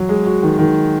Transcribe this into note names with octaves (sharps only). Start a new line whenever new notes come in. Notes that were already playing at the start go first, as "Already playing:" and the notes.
Already playing: F#3
G#3
F#4
D#3
D#3